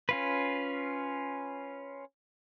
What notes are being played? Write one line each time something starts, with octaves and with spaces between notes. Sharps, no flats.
C#4 F4 B4